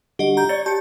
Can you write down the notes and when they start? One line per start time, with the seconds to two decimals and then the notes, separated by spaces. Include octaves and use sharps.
0.19 D3 G3 F#4 G4 D#5
0.37 A#5 G6
0.49 C#5 D5 C#6 A6
0.66 G4 G5 A5 C#7